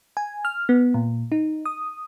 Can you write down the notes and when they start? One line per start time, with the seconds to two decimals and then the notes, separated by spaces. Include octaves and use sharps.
0.17 G#5
0.45 F6
0.69 B3
0.94 A#2
1.32 D#4
1.66 D#6